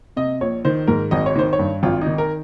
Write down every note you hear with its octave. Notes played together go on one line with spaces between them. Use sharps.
C3 D#5
A#1 C#5
D#3 C5
G#2 A#4
G#1 D#5
C#5
D#3 C5
C#5
G2
G#1 F4
D#4
D#3
A#4